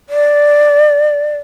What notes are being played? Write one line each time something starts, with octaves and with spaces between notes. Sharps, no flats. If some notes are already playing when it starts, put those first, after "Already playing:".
D5